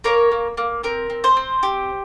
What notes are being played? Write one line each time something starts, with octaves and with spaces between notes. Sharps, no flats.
A#3 A#4 C#5
A#3
A#3
C4 A#4
C4
C5
C4
G4